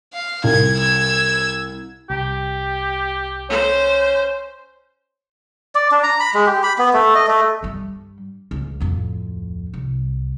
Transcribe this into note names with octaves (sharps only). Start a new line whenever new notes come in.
F5
C2 G#6
E6 G#6
C2 G4
C#4 C5
D5
D4
A#5
B5
G#3
G4
B5
B3
A3
D#5
A3
G2 G3
C#2
D1 F2
C2